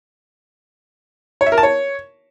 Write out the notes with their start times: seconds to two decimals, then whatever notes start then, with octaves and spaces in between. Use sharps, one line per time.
1.41 C#5
1.46 E5
1.52 A#4
1.58 A5
1.63 C#5